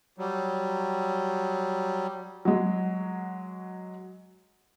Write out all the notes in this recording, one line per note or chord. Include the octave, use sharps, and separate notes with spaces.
F#3 G3
F#3 G#3